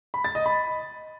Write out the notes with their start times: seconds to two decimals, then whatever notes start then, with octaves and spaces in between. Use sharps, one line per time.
0.14 B5
0.24 A6
0.35 D#5
0.46 B5